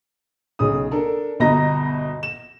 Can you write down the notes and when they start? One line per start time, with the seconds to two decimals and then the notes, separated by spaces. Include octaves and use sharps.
0.59 B1 C#3 D#6
0.91 D4 A4 A#4
1.40 G1 B2 D#5 A#5 A#6
2.23 E7